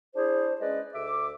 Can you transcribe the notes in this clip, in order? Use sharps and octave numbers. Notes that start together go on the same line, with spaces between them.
D4 E4 G#4 C5
G#3 C#4 B4 D5 D#5
D2 E5 D6